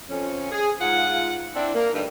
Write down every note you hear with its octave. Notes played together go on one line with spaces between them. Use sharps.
F2 C#4
G#4
G#2 F4 F#5
C4 D4 E4
A#3
D2 G2 D3 G3 D#4 B4